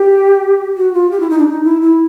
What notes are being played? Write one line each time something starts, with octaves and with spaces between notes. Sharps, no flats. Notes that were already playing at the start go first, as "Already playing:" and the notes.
Already playing: G4
F#4
F4
G4
E4
D#4
D4
D#4
E4
E4